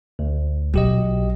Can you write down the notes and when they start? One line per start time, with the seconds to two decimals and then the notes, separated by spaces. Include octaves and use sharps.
0.19 D2
0.74 B1 F#4 G4 D#5